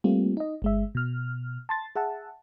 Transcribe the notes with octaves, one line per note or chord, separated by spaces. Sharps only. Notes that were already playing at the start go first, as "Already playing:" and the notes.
G3 A3 A#3 C4 F4 G4
D#4 D#5
G1 G#3 E5
B2 F6
A5 C6 A6
G#4 E5 F#5 A5